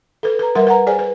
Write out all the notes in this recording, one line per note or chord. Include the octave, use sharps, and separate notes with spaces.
A4 B4
B4 A#5
G3 A#4 B4 E5 F#5 C6
B4 F#5 A#5
G#4 C5 D5 G#5
B4